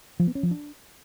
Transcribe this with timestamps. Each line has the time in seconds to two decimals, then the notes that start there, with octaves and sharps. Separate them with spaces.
0.20 F3
0.27 B3
0.35 C#4
0.43 F3
0.51 D4